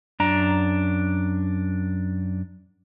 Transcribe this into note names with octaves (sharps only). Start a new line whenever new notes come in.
F#2 D4 A#5